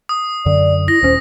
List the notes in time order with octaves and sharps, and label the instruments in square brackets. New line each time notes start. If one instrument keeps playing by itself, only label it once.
[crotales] D#6
[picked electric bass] F#2 D3 [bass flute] D5
[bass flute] E4 [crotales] A#6
[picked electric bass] D#1 C#4 [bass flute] C5